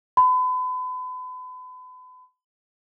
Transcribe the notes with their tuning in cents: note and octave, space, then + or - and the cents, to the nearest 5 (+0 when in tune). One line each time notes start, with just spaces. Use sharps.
B5 +35